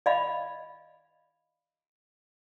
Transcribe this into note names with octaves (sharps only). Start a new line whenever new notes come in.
D5 D#5 F5 B5